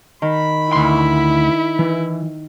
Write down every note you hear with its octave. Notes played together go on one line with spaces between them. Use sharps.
D#3 B5
D2 E4 C6
E3